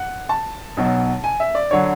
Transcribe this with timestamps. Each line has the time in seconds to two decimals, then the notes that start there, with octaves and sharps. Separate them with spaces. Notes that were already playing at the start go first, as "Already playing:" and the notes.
Already playing: F#5
0.29 A5
0.77 B1 B2 F#3
1.24 G#5
1.40 E5
1.55 D5
1.71 D3 F#3 C#5